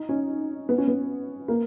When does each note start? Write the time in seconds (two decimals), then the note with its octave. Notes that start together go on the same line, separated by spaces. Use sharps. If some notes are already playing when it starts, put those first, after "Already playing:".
Already playing: D#4
0.09 C#4
0.69 B3
0.78 C#4
0.88 B3
1.48 A#3